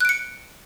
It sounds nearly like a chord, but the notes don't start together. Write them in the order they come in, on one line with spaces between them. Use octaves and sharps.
F#6 D7 C#7